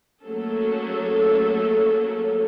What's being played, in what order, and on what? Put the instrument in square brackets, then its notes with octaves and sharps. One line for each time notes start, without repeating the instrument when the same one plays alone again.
[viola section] F#3 A3 A#3 C#4 G#4 A4